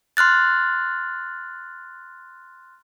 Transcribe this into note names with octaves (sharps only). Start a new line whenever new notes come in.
C6 F6 F#6 A6